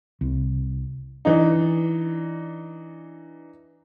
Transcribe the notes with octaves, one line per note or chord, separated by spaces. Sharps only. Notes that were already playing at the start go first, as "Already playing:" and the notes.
C2
E3 D4 D#4